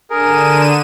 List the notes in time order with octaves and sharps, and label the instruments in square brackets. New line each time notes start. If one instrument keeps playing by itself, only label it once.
[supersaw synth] D3 D#7 E7 [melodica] G#4 A#4